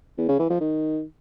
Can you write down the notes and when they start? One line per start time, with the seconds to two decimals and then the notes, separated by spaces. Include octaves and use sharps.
0.18 E2
0.28 C#3
0.39 E3
0.50 F3
0.60 D#3